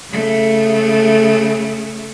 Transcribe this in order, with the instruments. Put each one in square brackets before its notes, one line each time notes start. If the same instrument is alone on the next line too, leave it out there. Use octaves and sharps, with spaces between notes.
[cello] C#3 A3